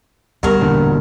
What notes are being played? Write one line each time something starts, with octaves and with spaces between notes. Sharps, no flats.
D2 G2 G#3 B3 F#4 A#4
E1 A#2 D3